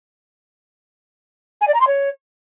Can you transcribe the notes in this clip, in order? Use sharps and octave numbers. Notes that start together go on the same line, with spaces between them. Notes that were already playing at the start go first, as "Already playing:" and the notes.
G#5
D5
A#5
C6
C#5